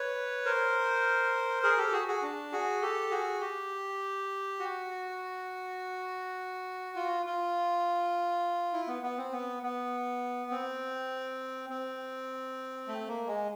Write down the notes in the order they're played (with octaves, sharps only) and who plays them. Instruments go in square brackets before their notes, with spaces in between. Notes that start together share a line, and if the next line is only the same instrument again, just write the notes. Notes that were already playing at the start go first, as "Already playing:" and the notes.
Already playing: [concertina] B4 C#5
A#4 C5
G#4 A#4
G4 A4
F#4 G#4
F#4 G#4
D4
F#4 G#4
G4 A4
F#4 G#4
G4
F#4
F4
F4
E4
B3
B3
C4
B3
B3
C4
C4
A3
A#3
G#3